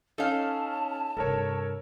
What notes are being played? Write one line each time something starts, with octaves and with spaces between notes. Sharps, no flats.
C#4 D#4 A4 F5 A5
G2 C3 A4 A#4 C#5